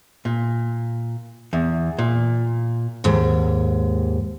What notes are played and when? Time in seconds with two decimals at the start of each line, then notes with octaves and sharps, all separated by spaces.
0.25 A#2
1.53 E2
1.99 A#2
3.04 D#2 G#2